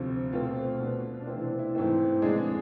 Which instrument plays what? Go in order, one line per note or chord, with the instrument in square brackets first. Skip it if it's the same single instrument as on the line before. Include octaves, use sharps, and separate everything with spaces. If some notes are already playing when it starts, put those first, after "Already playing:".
Already playing: [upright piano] D2 C3 F3
B2 A3 C4 F4
B2 B3 D4
D4
C3 E3 A3 C4 E4
D4
E4
G#2 E3 A3 C4
F2 D3 G#3 D4 G#4
G#4